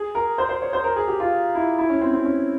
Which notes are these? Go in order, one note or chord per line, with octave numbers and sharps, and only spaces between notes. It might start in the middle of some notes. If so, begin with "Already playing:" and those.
Already playing: G#4
A#4
C5
C5
C#5
C5
A#4
G#4
G4
F4
E4
E4
C#4
C4
C4
C#4